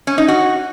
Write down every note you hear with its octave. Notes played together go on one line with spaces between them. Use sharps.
C#4
D#4
F#4